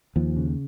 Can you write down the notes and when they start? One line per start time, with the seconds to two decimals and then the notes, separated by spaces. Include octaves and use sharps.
0.16 D#2 F3
0.37 C#3